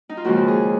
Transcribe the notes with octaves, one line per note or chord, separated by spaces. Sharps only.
D#4
F4
D#2 C#3 F3 G#3 F#4
G#4